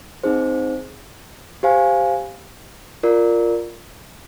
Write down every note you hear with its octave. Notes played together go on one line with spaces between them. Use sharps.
C4 D#4 G#4 C5
G4 C5 F5 G#5
F4 A#4 D5